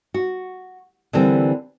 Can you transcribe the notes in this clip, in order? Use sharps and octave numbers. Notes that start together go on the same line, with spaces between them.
F#4
D3 E3 G3 A#3 C4